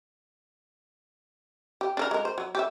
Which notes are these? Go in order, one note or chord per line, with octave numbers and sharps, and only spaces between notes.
G4
D4 A4 A#4
G#3 A#4
C5
F#3
G4 E5